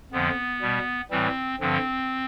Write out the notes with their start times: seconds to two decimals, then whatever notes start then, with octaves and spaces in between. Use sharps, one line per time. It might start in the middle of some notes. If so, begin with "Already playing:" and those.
0.12 F2 D3 F3 B3
0.61 B2 G3
1.11 A2 E3 G3 C4
1.60 G2 D3 F3 C4